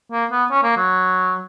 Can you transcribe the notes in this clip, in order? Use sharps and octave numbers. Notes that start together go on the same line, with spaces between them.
A#3
B3
C#4
A#3
F#3